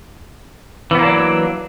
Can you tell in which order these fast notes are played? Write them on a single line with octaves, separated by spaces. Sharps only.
E3 B3 A#3 D4 F#3